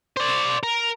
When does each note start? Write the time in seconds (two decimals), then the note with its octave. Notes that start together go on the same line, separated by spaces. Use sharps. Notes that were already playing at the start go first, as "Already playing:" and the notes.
0.17 C5 D5
0.63 A#4